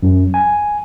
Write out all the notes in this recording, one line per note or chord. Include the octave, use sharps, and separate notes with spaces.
F#2
G#5